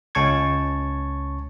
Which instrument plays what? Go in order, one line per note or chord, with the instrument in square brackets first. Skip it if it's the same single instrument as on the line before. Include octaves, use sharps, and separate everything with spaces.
[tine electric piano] C#2 C#4 A5 C#6 G#6